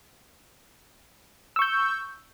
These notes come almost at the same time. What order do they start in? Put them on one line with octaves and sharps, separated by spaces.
E6 C#6 G6